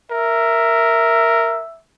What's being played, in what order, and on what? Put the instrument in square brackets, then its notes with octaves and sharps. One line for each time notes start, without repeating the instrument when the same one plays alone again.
[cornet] A#4 [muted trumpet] E5